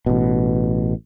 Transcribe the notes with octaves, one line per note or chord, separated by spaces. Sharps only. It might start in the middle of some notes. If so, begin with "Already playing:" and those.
A1 B2